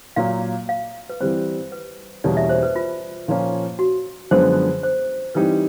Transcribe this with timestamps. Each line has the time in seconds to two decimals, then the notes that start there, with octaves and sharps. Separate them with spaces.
0.16 A#2 F#3 A#3 F5
0.69 F5
1.10 B4
1.20 E3 G3 C4 C5
1.72 B4
2.24 E2 B2 G3 A#3 C#4 D5
2.37 E5
2.49 C5
2.63 B4
2.76 F4
3.28 A#2 F3 A#3 C#4
3.79 F#4
4.31 F#2 D3 F3 G#3 B3 C5
4.83 C5
5.35 E3 G3 C4 D#4 G4 B4